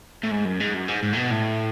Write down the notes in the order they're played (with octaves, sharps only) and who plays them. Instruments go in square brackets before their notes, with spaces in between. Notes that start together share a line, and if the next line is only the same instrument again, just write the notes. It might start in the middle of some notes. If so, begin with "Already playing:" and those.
[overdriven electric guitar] A2
G#2
F#2
G#2
F#2
G#2
G#2
A2
B2
A2